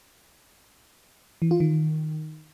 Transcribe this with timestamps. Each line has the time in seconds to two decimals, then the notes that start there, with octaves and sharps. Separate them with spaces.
1.42 E3
1.51 F4
1.60 D#3